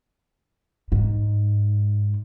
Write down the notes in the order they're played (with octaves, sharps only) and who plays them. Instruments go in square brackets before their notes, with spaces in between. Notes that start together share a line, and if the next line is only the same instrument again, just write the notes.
[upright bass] G#2